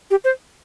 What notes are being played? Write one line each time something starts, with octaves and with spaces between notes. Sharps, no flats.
G4
C5